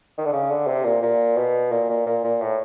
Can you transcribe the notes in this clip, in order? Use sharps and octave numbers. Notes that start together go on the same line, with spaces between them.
D#3
D3
C#3
D3
C3
A#2
A#2
B2
A#2
A#2
A#2
A#2
A2